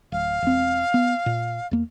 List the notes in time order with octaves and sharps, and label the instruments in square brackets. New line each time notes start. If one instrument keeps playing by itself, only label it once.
[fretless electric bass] D1 [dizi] F5
[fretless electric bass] E1 C4
B3
A#2
E2 A#3